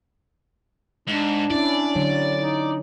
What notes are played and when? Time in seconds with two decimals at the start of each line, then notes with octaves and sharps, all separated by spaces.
1.08 G#2 D4
1.51 C#4 E4 D5
1.95 D3 F#3
2.35 D#4